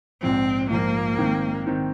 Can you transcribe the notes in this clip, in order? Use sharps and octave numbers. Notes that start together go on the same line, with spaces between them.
A#1 G#2 F3 C4
A#1 G#2 F3 A#3
G#2 D#3 C4 D#4
D#3 C4 D#4